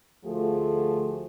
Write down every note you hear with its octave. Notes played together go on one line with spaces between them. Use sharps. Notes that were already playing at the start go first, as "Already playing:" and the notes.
D2 F3 A3 F#4 G#4